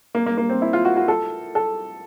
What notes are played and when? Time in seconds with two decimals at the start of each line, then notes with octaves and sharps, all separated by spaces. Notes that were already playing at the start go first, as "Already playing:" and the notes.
0.15 A#3
0.26 A#3
0.38 A#3
0.50 C4
0.62 E4
0.73 F4
0.85 F#4
0.97 F#4
1.08 A4
1.55 A4